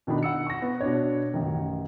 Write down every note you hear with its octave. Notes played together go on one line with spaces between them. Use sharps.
B2 D#3 D4 D#4 B5
F#5 E6 C#7
C#6 A#6
B3
B2 D4 C#5
A1 F#2 D#3